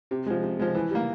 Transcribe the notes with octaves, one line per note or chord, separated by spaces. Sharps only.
C3
F3 G#3
C3
F3 G#3
E3
G3 A#3